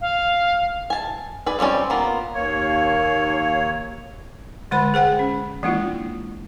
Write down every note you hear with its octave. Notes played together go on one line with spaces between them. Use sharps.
F5
G#5 A5
G#4 B4 D5
F3 G3 C4 C#4 D5
A#3 B3 F4
D#2 A#3 C#5
D3 G#3 C5 B5
G#4 C5 F#5 G5
C#4
E3 G#3 A#3 D4 E4 F4